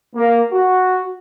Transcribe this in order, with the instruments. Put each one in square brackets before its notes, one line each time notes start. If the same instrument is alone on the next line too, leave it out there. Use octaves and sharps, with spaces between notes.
[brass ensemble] A#3
F#4